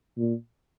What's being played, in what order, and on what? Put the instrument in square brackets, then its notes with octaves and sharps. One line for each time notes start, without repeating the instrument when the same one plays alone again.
[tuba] A#2